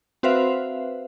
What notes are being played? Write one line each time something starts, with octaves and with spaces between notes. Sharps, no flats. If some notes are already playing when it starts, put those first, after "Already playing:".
C4 F#4 B4 C5 E5 F5